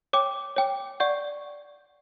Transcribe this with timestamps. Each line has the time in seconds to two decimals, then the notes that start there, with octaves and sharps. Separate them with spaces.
0.13 C#5 G5 D6
0.56 C#5 G5 D6
1.00 D5 F#5 C#6 G6